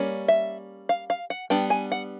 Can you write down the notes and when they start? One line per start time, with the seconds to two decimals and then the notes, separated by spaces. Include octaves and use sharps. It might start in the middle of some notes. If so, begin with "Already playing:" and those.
Already playing: G3 A#3 C#4
0.28 E5
0.89 F5
1.10 F5
1.30 F#5
1.50 G3 B3 D4 G5
1.70 G#5
1.92 F#5